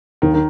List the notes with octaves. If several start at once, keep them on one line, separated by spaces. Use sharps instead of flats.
D#2 D#3
D#3